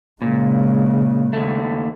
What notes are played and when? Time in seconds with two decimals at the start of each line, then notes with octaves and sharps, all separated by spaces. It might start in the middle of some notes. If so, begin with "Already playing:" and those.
0.22 A#2 C#3 G#3
1.33 D#2 A3